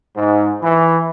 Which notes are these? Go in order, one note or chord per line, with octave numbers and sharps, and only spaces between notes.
G#2
E3